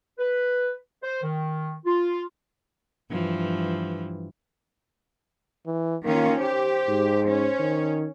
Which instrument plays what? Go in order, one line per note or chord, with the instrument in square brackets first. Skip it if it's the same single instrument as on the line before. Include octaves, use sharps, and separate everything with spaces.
[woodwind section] B4
C5
D#3
F4
[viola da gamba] G2 E3 F3
[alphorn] E3
[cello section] D#3 C#4 F4 [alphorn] A#3
[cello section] G4 [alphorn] C5
[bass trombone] G#2
[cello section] C#4
[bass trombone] D#3